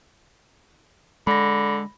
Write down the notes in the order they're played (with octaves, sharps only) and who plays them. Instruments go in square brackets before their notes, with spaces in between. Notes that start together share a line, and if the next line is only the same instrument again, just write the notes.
[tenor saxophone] D3 [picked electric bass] G#3 [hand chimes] B5 A#6